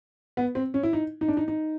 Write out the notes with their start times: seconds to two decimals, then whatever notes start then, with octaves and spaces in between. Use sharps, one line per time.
0.37 B3
0.55 C4
0.74 C#4
0.83 E4
0.93 D#4
1.21 D#4
1.28 D4
1.37 D#4
1.48 D#4